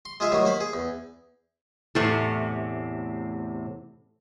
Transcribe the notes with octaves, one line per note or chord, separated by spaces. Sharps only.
C6
G#3 F4 G#4 E5
A2 D#3 F#3 G3
A#3 C5 B5
G#4
E2
E2 A2 C3 A3 A4